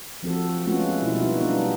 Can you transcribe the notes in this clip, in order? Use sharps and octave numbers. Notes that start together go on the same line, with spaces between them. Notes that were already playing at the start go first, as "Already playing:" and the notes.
F3 C4 F#4 A4
G#3 A3 B3 C#4 F4 F#4
B2 G3 E4
A#3 B3 D#4 F4 F#4
G3 B3 D4 D#4 F4